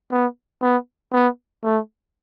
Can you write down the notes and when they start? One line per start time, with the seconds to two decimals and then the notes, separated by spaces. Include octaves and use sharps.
0.11 B3
0.61 B3
1.12 B3
1.63 A3